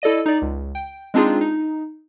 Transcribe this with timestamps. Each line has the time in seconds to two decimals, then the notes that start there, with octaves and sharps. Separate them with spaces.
0.02 E4 A4 D5 D#5 D#7
0.26 D#4 D5
0.42 C#2
0.75 G5
1.14 G#3 C4 D4 D#4 F4 G#4
1.41 D#4